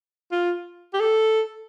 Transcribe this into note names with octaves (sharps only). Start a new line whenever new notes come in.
F4
G4
A4